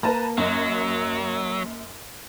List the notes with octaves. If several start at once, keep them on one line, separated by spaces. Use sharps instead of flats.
A#3 B4 A5 A#5
F#2 F#3 D#5